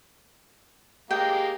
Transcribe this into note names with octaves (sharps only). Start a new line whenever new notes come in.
G#3 A#3 G4 G5